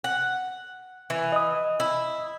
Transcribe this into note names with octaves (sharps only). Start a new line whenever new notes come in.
F#5
E3
D#5 D#6
E4